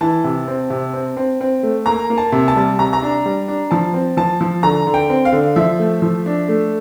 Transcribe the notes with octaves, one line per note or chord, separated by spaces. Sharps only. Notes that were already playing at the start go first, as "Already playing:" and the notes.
E3 A5
C3
C4
C3
C4
C4
C4
A3
A#3 A#5
A#3
A5
C3
A5
G3
C3 A#5
A#5
D4
G3
D4
F3 A5
C4
F3 A5
F3
D3 A#5
D3
G5
C4
F5
D3
F3 E5
A3
F3
D4
A3